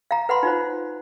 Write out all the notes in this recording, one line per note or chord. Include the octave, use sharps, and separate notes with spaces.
F5 A#5
B4 F#5 B5 C6
D#4 F4 C5